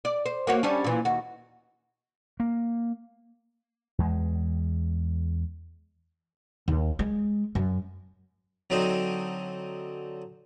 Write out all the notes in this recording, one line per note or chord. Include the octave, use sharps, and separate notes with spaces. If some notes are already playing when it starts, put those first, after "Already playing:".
D5
C5
A#3 F#4 C#5
G3 C#4 D4
A#2 E3
D#2 F#4
A#3
E2 G#3
D#2
G#3
F#2
D3 F#3 C4 D#4